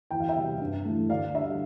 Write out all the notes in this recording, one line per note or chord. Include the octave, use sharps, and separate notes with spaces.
E2 G5
F5
E5 G5
C3 G3
G2
E3 A3
D2 D5 F5
D3 G3 E5